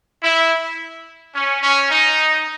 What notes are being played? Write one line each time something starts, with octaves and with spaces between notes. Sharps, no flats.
E4
C#4
C#4
D#4